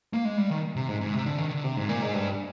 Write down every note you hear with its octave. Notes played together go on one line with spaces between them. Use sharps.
A#3
G#3
G3
D#3
C3
G#2
G#2
C3
D3
D#3
D3
C3
G#2
A#2
G#2
G2